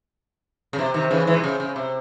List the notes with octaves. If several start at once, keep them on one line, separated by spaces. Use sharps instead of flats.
C#3
C3
C3 D#3
C#3 E3
E3 G#3
C3
C#3
C#3
C3